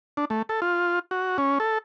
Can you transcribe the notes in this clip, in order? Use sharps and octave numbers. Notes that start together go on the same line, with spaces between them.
D4
A3
A4
F4
F#4
C#4
A4